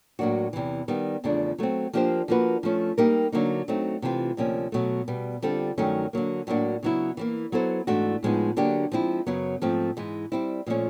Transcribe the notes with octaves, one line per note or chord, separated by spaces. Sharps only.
A2 F#3 A#3 D4 F#4
E2 C3 E3
D#3 G3 B3
E2 C#3 F3 A3 D4
F#3 A3 C4
F3 A#3 D4 G4 C5
F3 A#3 D4 F#4 B4
F3 A3 C#4
G3 A#3 D#4 G4 A#4
D3 F#3 A#3 D#4
F#3 A3 C4 D#4
C3 E3 A3 C4 F4
D2 C3 F3 A#3 C#4
B2 F#3 A3
B2 G3 B3
D3 G3 C4 F4 A4
G2 D#3 F#3 A3 C#4
D3 F#3 A#3
A2 F#3 A#3 D4 F#4
C#3 F#3 B3 E4
E3 G3 A#3
F#3 B3 E4 A4 C5
G#2 E3 A3 D4 F#4
A2 F3 G#3 B3 D#4
D3 F#3 A#3 D4 G4
F3 G#3 C4 E4
F#2 C#3 F#3 B3
G#2 F3 A3 C4
G#2 E3 G#3
G3 C4 E4
A#2 F3 A3 C#4